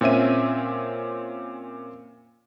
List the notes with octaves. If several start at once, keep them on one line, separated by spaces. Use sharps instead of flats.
A#2 C4 C#4 E5 D#7